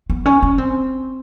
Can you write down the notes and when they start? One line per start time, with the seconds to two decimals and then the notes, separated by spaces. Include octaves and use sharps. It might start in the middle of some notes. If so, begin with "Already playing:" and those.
0.10 B3
0.26 C#4
0.43 C#4
0.58 C4